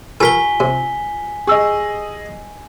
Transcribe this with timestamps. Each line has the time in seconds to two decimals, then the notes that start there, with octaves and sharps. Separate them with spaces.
0.20 F4 G4 A4 A#4 G#5 B6 G7
0.60 C3
1.47 G4 G#4 D#5 E6